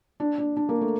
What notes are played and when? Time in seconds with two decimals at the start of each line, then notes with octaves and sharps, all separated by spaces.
0.20 D4
0.38 D4
0.57 D4
0.69 A#3
0.81 A3